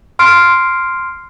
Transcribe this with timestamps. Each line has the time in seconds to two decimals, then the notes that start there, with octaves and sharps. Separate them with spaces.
0.19 C6 F6 C7 D7